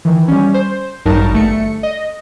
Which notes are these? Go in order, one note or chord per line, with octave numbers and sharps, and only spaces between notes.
D#3 E3
G3 C#4
C5
A1 G2 F#3 D#4 A#4 A5
G1 A3 C#7
D#5